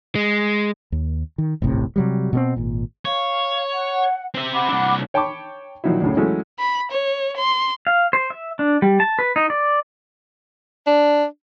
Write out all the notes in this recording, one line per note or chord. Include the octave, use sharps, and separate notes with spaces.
G#3
D#2
D#3
D#1 G#1 A2 C3
C3 F#3 G3
B2 G#3 C4
G#1 A#2
C#5 F5
F#5
C4 E5
F#5 B5 D6
C2 D4
C#5 G5 A5 B5 C#6 D6
A#2 D#3 F3 F#3 D#4 E4
D2 A2 C#3
E3 F#3 G#3 A3 C#4 E4
B5
C#5
C6
F5
C5
E5
D4
G3
A5
B4
D#4
D5
D4